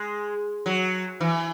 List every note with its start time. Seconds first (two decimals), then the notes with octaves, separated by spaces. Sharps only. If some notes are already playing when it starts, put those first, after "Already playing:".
Already playing: G#3
0.66 F#3
1.20 E3